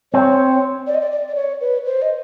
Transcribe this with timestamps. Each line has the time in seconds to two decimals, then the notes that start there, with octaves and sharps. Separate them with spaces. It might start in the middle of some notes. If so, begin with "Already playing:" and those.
0.13 C4 C#5
0.87 D5
0.95 D#5
1.01 D5
1.11 D5
1.28 D5
1.35 C#5
1.61 B4
1.85 C5
2.02 D#5